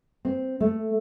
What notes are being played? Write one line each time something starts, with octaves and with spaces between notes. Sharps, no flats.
C4
A3